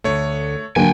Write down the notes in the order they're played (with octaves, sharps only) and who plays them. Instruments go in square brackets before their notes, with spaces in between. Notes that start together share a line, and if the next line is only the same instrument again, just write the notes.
[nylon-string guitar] D2 D3 [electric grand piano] A3 C#5
[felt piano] D2 A#3 [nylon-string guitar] F#3 [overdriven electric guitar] G5 G#5